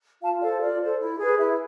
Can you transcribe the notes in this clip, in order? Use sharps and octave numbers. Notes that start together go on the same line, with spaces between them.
F4 F5 A5
A4 C5 D5 F5
F4 D5
A4 C5
E4
G#4 B4
E4 E5